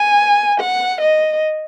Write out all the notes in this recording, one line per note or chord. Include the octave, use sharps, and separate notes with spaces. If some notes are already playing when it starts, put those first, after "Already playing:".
Already playing: G#5
F#5
D#5